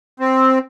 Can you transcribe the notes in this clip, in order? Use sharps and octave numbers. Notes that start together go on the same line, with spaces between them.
C4